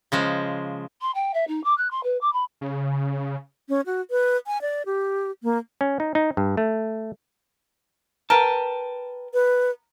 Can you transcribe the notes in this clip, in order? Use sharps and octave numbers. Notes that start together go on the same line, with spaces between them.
C#3 F3 G#3
C6
G5
E5
D#4
D6
F#6
C6
B4
D6
B5
C#3
C#4
F#4
B4
G#5
D5
G4
A#3
C#4
D#4
D#4
G2
A3
A#4 B4 G5 A5
B4